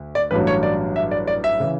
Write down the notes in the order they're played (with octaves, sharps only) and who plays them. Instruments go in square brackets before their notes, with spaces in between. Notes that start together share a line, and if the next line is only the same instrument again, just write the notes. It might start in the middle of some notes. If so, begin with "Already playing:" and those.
Already playing: [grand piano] D2
D5
A1 G2 F#3 B4
C#5
D5
E5
D5
D5
E5
C#3 E3